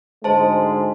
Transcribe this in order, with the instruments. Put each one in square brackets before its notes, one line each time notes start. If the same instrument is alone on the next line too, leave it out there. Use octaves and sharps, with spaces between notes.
[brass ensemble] D2 G#2 G#3 [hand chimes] C5 A5